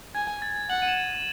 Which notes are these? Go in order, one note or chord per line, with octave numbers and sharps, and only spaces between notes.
G#5 G#6
A6
F#5 F#7
D#7
E7
D#7